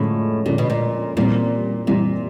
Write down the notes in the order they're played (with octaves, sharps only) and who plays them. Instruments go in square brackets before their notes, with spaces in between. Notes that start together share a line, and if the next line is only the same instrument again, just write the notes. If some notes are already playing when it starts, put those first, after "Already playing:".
Already playing: [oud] A2 [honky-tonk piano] D3 F3 G#3 C#4
[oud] A#2 [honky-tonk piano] D3 F3 G#3 C#4
[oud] B2
A#2
[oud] A#2 [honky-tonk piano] E3 G3 C4
[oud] A#2 [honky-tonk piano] E3 G3 C4